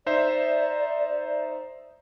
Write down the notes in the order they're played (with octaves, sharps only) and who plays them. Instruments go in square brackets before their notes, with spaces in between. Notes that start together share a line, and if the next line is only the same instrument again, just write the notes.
[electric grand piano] D#4 C5 E5 [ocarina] D5